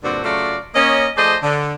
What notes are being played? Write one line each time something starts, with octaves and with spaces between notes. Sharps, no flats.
G2 A#2 D3 C4 D4 F#4
C#3 F#3 A3 F4 F#4 D5
A#3 C#4 D#5
F3 A3 G#4 C5 D5 D#5
D3